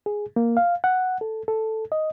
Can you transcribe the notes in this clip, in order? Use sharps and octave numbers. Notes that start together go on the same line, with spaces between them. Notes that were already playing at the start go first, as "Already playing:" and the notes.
G#4
A#3
F5
F#5
A4
A4
D#5